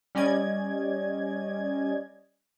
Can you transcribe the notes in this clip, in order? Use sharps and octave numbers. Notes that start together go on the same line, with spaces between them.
G3 C#4 D5 D#5 G#6